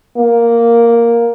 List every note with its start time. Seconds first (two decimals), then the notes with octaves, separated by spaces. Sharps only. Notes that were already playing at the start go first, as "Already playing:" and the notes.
0.17 A#3